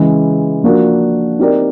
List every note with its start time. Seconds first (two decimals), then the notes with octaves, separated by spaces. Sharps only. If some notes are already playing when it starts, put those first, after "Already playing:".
Already playing: C#3 E3 G#3
0.64 F3 A#3 D4 F#4 A#4
1.39 C4 D#4 G4 A#4 D5